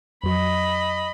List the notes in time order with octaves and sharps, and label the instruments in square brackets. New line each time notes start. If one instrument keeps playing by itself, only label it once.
[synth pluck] F2 F#3 [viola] D#5 B5